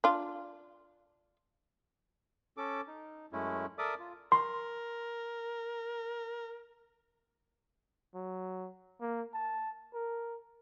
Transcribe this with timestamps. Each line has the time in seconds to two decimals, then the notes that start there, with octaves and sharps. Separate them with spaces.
0.04 D4 F4
2.57 C#4 A4 D6
2.87 D#4
3.32 F#2 G#3 A3 C#4 E4
3.79 A4 A#4 D5 E5 D6 D#6
3.99 F4
4.32 A#4 C6
8.14 F#3
9.01 A#3
9.34 A5
9.94 A#4